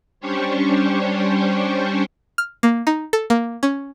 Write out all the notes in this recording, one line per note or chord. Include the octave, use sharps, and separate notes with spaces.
G3 C#4 D4 G4 C5 C#5
F6
A#3
D#4
A4
A#3
C#4